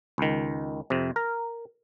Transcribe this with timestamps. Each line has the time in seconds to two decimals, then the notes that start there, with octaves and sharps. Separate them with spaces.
0.18 C#2 D#3
0.90 F2 C3
1.16 A#4